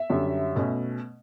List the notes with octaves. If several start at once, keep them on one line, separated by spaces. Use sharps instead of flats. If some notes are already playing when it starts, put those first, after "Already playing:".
Already playing: E5
F#2 D3 G3
B2 A3 C#4